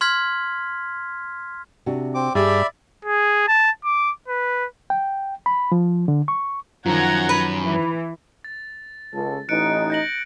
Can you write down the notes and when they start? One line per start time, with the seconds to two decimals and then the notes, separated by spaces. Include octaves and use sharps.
0.01 C6 F6 G#6 B6
1.86 C3 D4 F#4
2.14 C4 D6
2.35 G2 G4 G#4 D5 E5 B5
3.05 G#4
3.48 A5
3.85 D6
4.28 B4
4.90 G5
5.46 B5
5.72 F3
6.08 D3
6.28 C#6
6.86 F#2 D#3 F3 F#5 A#5 G#6
7.29 B4
7.64 E3
8.44 A6
9.13 C#2 A4
9.49 A1 E3 D#4 F#6 C#7 D7
9.90 G6 A#6 F#7